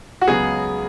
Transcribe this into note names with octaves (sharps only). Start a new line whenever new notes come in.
F#4
C#2 C#3 F#3 B3 G#4